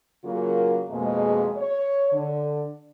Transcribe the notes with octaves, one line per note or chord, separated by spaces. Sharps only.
C#3 F#3 A#3 F4 A#4
F2 B2 G#3 A#3 G#4
C#5
D3